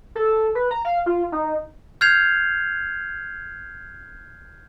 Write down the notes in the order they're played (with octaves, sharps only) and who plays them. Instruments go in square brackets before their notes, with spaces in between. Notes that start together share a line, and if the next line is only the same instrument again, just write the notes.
[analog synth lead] A4
B4
A#5
F5
F4
D#4
[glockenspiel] F6 G6 G#6 C7 F7